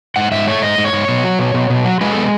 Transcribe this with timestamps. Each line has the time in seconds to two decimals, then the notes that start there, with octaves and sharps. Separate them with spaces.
0.16 G#2 F#5
0.31 G#2 E5
0.47 A3 C#5
0.62 G#2 D#5
0.78 G#2
0.85 C#5
0.93 G#2
1.08 B2
1.24 F#3
1.39 B2
1.54 B2
1.70 B2
1.85 F#3
2.01 G#3 B4
2.12 B3 A4